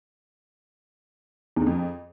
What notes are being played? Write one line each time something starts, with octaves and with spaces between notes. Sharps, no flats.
E2
D3
F2